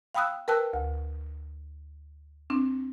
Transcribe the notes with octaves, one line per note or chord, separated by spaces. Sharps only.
F5 G5 B5 D#6 E6 F#6
A#4 B4 G5 A5 E6 F#6
D2
C4 D4